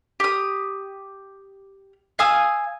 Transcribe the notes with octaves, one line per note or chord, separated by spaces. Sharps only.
G4 D#6
F5 G#5 D#6 E6